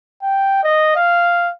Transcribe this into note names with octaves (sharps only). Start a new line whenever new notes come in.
G5
D#5
F5